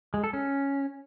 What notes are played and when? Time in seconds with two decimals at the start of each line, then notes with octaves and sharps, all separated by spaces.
0.14 G#3
0.24 A4
0.33 C#4